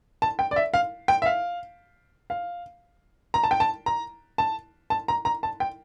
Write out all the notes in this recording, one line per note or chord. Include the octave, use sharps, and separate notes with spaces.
A5
G5
D5
E5
F5
G5
E5
F5
F5
A#5
A5
G5
A5
A#5
A5
A5
A#5
A#5
A5
G5